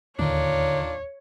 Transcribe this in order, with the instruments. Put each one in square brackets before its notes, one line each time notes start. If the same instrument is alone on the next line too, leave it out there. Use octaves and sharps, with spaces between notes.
[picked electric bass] D1 D#2 [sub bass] D3 [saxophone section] D#3 D4 F4 [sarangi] C#5